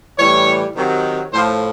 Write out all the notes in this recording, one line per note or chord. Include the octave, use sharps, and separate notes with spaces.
A2 E3 G3 C#5
C3 D#3 F#3
A2 F3 C5